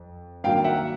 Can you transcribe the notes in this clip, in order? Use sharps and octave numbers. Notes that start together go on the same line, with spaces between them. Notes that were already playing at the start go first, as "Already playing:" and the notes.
Already playing: F2
G2 D#3 F#3 A#3 F5 G5
E5 F#5